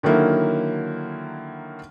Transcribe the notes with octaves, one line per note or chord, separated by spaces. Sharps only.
D3 D#3 F#3 A#3 E4